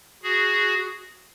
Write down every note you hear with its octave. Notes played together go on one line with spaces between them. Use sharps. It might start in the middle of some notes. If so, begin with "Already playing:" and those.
F#4 G#4